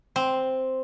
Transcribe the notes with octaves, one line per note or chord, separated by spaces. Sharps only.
C4